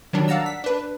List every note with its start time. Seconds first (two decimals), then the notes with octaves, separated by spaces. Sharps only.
0.13 D#3 F#3 G3 D4
0.28 D5 F5 F#5 A5 A#5 E6
0.46 B6
0.64 D4 B4